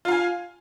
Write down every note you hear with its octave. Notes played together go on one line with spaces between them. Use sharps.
F4 F5 G#5